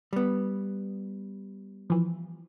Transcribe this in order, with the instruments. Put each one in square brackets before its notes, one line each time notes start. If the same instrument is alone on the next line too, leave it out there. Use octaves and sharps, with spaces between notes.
[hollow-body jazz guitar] G3 B3
[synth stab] E3 F3